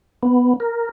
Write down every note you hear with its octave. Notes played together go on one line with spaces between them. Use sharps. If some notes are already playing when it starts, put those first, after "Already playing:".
B3
A#4